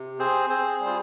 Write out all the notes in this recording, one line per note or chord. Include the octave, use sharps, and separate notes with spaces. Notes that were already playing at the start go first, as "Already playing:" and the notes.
Already playing: C3
C4 G#4 C5
C4 G#4 C5
G3
F4